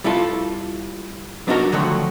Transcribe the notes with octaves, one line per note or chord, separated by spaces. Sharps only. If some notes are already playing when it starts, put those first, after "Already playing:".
G3 E4 F4 A4
F#3 B3 D4 D#4 F#4 A#4
D3 D#3 F3 F#3 A3